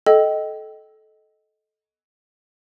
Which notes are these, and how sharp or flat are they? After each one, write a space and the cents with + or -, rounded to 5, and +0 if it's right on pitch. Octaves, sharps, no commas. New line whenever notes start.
A4 -20 D#5 +0 G5 -20